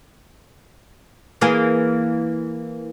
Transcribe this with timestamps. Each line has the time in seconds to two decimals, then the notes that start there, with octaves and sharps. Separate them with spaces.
1.41 E3 A#3 G#4